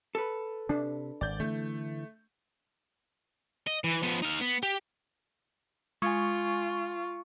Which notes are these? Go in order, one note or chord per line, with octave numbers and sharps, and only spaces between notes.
A4 B4
C3 D4
G#1 D5 G6
D3 E3 A3
D#5
E3
F3 B3
D#4 F5
B3
G4
G#3 F4 G#5 C#6